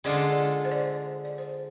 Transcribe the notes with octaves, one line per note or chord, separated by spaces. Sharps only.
D3 G#3 D4 F4 A4 D5
D5
C5
D5
D5
C5